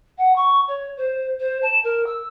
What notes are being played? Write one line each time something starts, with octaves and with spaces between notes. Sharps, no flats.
F#5
C#6
C#5
C5
C5
A5
A#4
E6